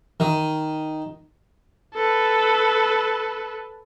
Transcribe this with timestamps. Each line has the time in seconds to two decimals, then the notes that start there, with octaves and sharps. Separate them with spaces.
0.20 D#3
1.94 A4 B4